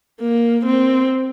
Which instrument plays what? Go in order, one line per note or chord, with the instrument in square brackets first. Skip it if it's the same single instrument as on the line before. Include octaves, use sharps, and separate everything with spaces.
[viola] A#3
C4